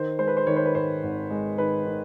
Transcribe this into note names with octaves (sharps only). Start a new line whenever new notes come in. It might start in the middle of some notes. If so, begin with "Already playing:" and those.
Already playing: D#3 C5
G#3 C5
B4
C5
D#3 C#5
C5
B4
G#2 C5
G#1
G#3
D#3 B4
D#3